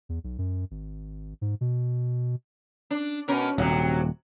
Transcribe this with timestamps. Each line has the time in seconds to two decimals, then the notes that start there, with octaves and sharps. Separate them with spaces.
0.09 E2
0.24 B1
0.38 F#2
0.71 G#1
1.41 G#2
1.61 B2
2.90 D4
3.28 B2 C#4 A#4
3.58 D#1 C3 F#3